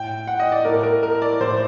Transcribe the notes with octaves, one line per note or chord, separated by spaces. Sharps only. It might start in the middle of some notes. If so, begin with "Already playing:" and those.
Already playing: A2 G5
F#5
D#5
D5
A2 A#4
A#4
A#4
D5
A2 C5